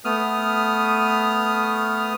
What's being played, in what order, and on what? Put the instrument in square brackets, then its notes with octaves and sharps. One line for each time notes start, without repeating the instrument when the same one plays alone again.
[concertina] A3 B3 D#6 F6